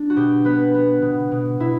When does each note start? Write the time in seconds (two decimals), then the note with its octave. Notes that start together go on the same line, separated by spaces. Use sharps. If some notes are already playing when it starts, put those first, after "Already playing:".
Already playing: D4
0.10 F#4
0.16 B2 G4
0.45 B3 B4
0.74 B3
1.02 B2
1.31 B2
1.60 B2 E4